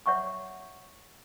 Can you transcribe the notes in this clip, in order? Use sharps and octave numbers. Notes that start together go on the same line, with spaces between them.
C#5 E5 F#5 C#6 D6